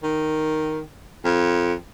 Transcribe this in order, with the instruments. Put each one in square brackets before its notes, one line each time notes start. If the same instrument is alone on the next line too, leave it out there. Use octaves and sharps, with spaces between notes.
[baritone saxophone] D#3
F2